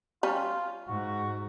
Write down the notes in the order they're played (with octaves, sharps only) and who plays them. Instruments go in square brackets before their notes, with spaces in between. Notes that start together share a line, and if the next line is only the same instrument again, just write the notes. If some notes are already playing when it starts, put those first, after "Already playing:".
[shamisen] G3 C#4 [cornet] F4
[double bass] G#2 [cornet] F#4